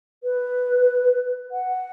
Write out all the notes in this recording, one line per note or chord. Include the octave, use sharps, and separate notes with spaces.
B4
F#5